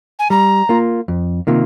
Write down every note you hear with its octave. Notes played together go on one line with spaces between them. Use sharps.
G#5
G3 A#5
A#3 F4
F2
C3 D#3 A#3 F4